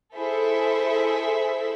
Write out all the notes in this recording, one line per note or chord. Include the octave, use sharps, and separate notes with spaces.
E4 G#4 A4 C5 E5